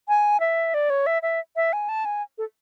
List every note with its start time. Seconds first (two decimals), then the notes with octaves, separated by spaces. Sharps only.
0.08 G#5
0.40 E5
0.74 D5
0.90 C#5
1.06 E5
1.22 E5
1.56 E5
1.73 G#5
1.89 A5
2.05 G#5
2.38 A4